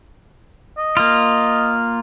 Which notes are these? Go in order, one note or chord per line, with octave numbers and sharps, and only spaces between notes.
D#5
A#3 F4